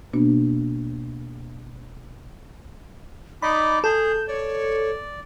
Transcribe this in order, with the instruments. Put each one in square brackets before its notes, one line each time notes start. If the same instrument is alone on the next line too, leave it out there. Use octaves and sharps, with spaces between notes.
[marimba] B2 A#3 B3 D4 F#4
[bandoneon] D#4 D5 D#5 [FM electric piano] B5 [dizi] D6
[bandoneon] G#4 [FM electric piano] A4 [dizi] G6
[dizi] C#5 [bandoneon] D5